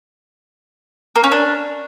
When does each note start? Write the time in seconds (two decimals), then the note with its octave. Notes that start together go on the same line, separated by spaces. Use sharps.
1.16 A#3
1.24 C#4
1.32 D4